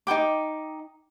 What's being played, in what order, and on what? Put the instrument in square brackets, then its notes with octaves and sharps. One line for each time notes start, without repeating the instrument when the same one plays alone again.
[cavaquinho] D#4 A#4 G5 D6